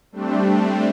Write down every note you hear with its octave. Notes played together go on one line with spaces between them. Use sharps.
G3 A3 C4 D4